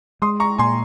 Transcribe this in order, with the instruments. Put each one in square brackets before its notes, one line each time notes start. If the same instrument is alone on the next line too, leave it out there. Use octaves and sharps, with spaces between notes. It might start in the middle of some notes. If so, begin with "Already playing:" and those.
[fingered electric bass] G#3 [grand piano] C6 D#6
[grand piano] A#5 C#6
[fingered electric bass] A#2 [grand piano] G#5 C6